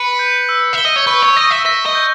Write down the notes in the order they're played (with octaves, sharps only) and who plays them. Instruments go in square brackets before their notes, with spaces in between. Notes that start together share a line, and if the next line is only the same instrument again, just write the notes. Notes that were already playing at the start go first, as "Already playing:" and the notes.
Already playing: [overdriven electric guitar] B4 [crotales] C#7
[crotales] G6
E6
[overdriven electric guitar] E5 [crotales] G7
[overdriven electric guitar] D#5
C#5
[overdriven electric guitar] B4 [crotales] C#6
[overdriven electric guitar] C#5
[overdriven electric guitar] D#5 [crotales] A#6
[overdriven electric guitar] E5
[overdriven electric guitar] E5 [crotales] A#6
[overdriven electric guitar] D#5
[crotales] G6